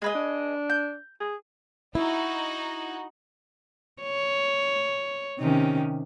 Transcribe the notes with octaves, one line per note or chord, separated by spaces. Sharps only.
G#3 G#4 B4 D#5
D4
G6
G#4
D#4 E4 F#4
C#5
C3 D#3 C#4